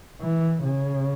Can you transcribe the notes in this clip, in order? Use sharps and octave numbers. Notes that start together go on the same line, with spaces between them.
E3
C#3